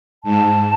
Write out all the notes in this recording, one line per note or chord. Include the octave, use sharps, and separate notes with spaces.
G#2 A5